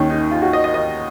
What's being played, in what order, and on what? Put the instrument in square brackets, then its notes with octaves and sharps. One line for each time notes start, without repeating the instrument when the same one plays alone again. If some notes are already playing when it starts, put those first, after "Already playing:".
Already playing: [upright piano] D#2 D#3 C#4
D#4
F4
F#4
D#5
D#5
D#5